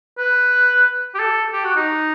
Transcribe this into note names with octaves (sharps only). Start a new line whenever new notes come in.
B4
G4
A4
G4
F#4
D#4